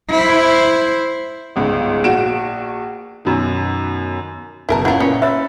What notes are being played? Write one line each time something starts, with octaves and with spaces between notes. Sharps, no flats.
E4 C5
G1 C#2 G#2
A#1 F#4 D7 E7
F#2 B2 D#3
F#1 B2 E4 A#4 A5 A#5
B3 C#4 E4 F4 F#5 A#5
A#2 B3 C#4
C#5 E5 B5 E6 A6